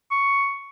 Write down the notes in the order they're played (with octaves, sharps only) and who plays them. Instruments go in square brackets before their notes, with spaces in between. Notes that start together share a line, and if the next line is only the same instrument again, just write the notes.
[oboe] C#6